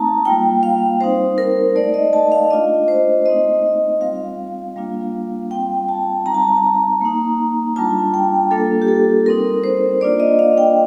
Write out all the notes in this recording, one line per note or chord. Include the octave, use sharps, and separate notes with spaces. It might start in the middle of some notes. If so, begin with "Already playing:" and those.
Already playing: A3 C4 D#4 A5 A#5
G3 A#3 F4 G5
F5
G3 C4 D#4 C5
A#4
A3 D#4 D5
D#5
A5
F5
A3 D4 F4 D#5
C5
A3 C4 D#4 D#5
G3 C4 F4 F5
G3 A#3 D4 F4
G3 C4 F4 G5
A5
G3 C4 D#4 A#5
A5
A#5
A#3 D#4
G3 D4 F4 A5
G5
G3 A#3 D4 F4 A4
G4
A4
G3 C4 D#4 A#4
C5
A#3 D4 F4 D5
D#5
F5
G5